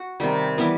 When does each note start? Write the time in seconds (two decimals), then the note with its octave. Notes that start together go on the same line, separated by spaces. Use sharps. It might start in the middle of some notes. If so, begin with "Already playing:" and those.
Already playing: F#4
0.20 C3 D#3 G3
0.58 E3 G3 B3